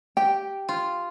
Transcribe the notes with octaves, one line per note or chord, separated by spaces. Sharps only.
G4 G5
F4